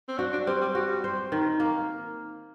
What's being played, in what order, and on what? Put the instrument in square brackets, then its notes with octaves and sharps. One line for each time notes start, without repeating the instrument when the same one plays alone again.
[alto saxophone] C4
[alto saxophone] D4 [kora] F#4
[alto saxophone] D4
[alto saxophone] G3 [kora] C4
[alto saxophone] G3
[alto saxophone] G3 [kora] F#4
[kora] C5
D#3
A#3